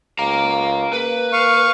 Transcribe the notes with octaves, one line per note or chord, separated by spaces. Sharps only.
C#2 F5 A#5
A#3 B4
F5 C#6